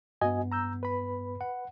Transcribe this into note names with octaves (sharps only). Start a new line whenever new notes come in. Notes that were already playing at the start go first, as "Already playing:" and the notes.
G2 B3 F#4 D#5 G#5
A#5 E6 G6
B4 B5
F#5